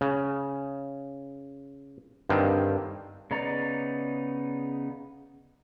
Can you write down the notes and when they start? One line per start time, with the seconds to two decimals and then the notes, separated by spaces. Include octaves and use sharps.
0.01 C#3
2.29 G2 D3 D#3 C4
3.31 C#3 B3 D#4 D5 A#5